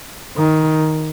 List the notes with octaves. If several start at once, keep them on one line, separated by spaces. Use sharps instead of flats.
D#3